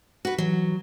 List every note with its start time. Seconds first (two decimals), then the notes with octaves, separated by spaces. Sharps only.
0.25 F#4 B4
0.38 E3 F#3